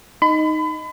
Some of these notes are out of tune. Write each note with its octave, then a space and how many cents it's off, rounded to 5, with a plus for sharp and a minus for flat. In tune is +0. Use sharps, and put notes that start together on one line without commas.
D#4 +0 B5 +35